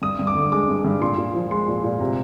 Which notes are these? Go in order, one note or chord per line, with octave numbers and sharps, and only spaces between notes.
G2 D#6
G2
D6
D3
G#3 D6
G2
G2
A#2 C6
A#2
F3
G#3 C6
A#2
A#2
C3